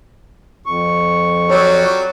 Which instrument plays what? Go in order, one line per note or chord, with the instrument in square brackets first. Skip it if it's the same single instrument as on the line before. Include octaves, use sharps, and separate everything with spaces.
[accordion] F2 C#6
[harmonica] F#3 G3 [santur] C#5